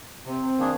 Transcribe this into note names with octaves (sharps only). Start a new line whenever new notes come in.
C3 C4
D#3 A#3 D4 G#4